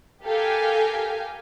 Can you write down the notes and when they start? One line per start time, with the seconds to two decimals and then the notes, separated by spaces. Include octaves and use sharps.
0.24 G4 A4 A#4 F5 G5 G#5